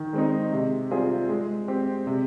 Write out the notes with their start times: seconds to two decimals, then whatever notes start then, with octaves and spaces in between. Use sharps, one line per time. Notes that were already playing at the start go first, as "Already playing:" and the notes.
Already playing: D#3
0.13 G#3 C4 D#4
0.52 C3
0.91 G3 C4 F4 G#4
1.29 G#3
1.68 C4 G4
2.07 C3